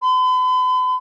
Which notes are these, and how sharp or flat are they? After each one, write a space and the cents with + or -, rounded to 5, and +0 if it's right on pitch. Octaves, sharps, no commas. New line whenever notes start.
B5 +45